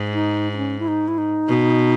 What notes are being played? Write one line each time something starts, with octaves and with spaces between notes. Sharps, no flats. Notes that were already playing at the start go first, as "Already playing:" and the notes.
Already playing: G#2
D#4
D#4
C#4
E4
D#4
E4
D#4
B2